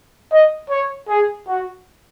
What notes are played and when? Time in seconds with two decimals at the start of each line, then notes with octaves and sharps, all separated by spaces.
0.32 D#5
0.70 C#5
1.09 G#4
1.48 F#4